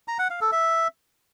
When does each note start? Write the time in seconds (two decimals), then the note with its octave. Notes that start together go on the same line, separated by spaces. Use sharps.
0.08 A#5
0.19 F#5
0.30 F5
0.41 A4
0.52 E5